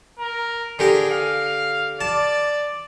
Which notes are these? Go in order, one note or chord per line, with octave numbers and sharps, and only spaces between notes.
A#4
D3 G4 G#4 A#4
F5
D5 A5